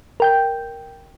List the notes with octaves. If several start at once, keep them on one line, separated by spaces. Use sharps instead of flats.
A#4 G5 G6